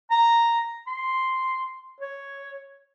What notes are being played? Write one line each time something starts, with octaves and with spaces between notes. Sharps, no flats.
A#5
C6
C#5